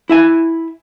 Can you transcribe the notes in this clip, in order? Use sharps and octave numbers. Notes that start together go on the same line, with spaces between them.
E4 E5 G#5